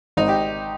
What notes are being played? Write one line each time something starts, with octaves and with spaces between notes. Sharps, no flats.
G#1 D#4
G4